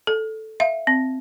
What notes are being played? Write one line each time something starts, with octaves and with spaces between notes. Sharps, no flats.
A4
E5 F5
C4